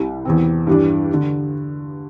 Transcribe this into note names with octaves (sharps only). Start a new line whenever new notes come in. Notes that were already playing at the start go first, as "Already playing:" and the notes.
Already playing: C2 C3 G3 E4
E2 E3 C4
G2 E3 G3 D4
D3